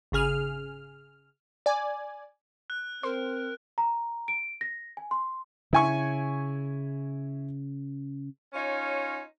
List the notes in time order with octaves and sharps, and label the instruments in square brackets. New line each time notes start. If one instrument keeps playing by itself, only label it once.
[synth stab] G#1 C#3 G#4 F6
D5 G#5
[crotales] F#6
[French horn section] C4 [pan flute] A#4 [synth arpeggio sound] C5
[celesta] A#5
D7
A#6
G#5
C6
[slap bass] C#3 [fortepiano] E4 G#5 C#6
[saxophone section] C#4 D#4 F4 C#5